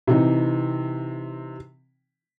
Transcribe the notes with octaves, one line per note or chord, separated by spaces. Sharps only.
C3 E3 D#4